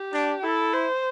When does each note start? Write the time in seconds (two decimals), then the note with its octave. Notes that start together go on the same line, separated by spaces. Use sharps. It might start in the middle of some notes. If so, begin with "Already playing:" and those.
Already playing: G4
0.12 D4
0.43 E4 A4
0.73 C5